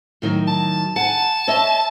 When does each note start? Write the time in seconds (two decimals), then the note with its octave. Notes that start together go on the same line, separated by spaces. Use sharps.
0.22 A2 D#3 F#3
0.47 A5
0.96 F#5 G#5 A5
1.47 C#5 D#5 E5